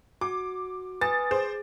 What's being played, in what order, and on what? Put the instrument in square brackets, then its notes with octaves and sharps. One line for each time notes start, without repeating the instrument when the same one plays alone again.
[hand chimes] F#4 [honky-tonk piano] D6
[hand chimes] B4 G#5 D#6 [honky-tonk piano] A6
[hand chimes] G#4 [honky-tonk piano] C5